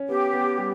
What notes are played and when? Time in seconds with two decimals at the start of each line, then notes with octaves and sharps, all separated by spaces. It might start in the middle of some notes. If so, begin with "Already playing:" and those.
Already playing: C#4
0.08 B3 G4
0.33 B3
0.58 G3